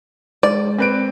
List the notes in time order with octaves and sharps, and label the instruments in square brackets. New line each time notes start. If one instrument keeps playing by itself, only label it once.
[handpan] G#3 [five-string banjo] D5
[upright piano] C4 B4 D7